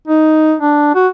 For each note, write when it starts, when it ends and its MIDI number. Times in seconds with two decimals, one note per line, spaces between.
0.08 0.54 63
0.59 0.92 62
0.95 1.08 66